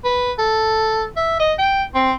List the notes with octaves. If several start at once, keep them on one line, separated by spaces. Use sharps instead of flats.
B4
A4
E5
D#5
G5
C4